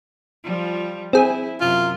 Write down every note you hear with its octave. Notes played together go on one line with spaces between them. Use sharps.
F3 G3 F4
C4 E4 G#4
F#2 C3 F4